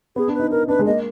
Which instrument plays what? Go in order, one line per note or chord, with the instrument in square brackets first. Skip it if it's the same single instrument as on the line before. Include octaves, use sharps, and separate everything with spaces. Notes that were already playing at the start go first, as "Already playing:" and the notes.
[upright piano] B3 [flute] G#4
[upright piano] D4
[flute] B4
[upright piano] D#4
[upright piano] D#4 [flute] A#4
[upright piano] D4 [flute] B4
[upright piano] G#3
[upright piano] A#3 [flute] D#5